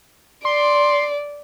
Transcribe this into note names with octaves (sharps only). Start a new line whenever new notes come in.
D5 C6